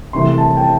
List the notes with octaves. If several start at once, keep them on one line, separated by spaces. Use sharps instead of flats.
C2 C3 E3 A3 C6
A5
G5
A5